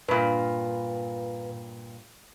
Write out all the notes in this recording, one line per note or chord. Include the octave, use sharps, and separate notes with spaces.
G2 A#2 B4